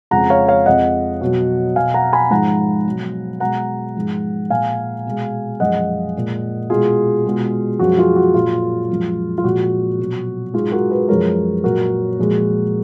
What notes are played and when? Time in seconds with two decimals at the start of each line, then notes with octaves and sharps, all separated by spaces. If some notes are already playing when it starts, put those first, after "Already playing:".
0.11 F2 C#3 F3 G#3 F#5 A#5
0.30 C#5 F5
0.48 C#5 F5
0.66 F2 F3 G#3 D#5 F#5
1.21 B2 F#3
1.76 B2 F#3 F5 G#5
1.94 F#5 A#5
2.13 G#5 B5
2.30 G#2 F3 G#3 F#5 A#5
2.86 B2 F#3
3.40 B2 G#3 F#5 A#5
3.96 G#2 F3 G#3
4.50 A#2 G#3 F5 G#5
5.06 B2 G#3
5.60 F#2 F3 G#3 D#5 F#5
6.15 A#2 G#3
6.70 B2 G#3 F4 G#4
7.25 B2 G#3
7.80 F#2 F3 G#3 F#4
7.98 F4 G#4
8.16 F#4
8.34 A#2 F#3 F4
8.89 F#2 F3 G#3
9.38 F4
9.44 A#2 F3 G#3 F#4
9.99 B2 F#3
10.54 G#2 F#3 F4 G#4
10.72 F#4 A#4
10.91 G#4 B4
11.09 F#2 F3 G#3 A#4 C#5
11.64 A#2 F#3 F#4 A#4
12.19 A#2 F3 G#3